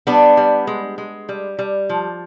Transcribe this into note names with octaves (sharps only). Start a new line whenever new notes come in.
G3 B3 D4
G3
G#3
G#3
G3
G3
F3